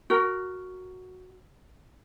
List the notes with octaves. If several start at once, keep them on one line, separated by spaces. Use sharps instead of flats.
F#4 A#4